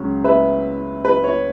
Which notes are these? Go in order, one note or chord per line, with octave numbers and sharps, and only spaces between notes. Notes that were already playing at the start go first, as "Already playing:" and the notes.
Already playing: C#2 C#3 F#3 C#4
B4 E5
B4
C#5